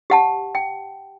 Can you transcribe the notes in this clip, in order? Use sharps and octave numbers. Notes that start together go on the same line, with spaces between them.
G4 F#5 A5
G5